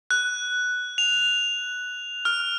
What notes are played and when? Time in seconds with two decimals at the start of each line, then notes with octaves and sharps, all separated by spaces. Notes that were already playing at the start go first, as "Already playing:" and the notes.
0.11 F#6
0.98 F7
2.25 F6